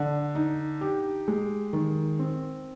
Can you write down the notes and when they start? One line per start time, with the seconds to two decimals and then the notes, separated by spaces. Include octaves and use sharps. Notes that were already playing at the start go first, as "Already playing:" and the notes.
Already playing: D3
0.35 D#4
0.81 G4
1.28 G#3
1.73 D#3
2.19 C4